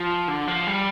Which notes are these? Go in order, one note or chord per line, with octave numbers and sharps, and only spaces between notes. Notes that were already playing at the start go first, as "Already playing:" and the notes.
Already playing: F3
D3
F3
G3